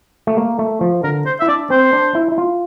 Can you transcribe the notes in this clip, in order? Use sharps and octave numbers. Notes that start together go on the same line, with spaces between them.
A3
A#3
A3
F3
D3 A#4
C5
E4 E5
D4 D5
C4 C5
D4
E4
E4
F4